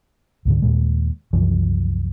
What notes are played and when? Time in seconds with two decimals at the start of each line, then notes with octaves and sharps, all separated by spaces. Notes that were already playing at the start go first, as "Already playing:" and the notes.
0.45 C#2 G#2 D3
0.62 D#2 A#2 G#3
1.33 C2 F#2 E3 F3